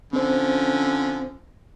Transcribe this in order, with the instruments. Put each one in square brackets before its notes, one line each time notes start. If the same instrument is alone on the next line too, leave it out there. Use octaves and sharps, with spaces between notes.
[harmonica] D3 F3 [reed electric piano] C4 C5 [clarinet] C#4